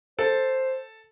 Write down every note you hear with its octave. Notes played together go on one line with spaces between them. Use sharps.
A4 C5